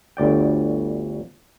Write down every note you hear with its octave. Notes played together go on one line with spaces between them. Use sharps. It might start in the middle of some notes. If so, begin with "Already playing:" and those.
G1 D2 D5 G5